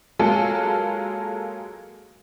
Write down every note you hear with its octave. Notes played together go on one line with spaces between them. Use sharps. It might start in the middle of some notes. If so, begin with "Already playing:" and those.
F#3 G#3 A#3 F4 A4